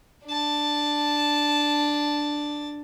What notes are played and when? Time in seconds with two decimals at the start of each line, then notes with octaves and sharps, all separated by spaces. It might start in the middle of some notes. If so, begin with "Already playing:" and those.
0.25 D4 A5